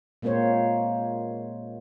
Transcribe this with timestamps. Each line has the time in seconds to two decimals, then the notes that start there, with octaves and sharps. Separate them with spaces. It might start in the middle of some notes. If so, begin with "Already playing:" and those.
0.22 A#2 G#3 A#3 C4 C5 C#5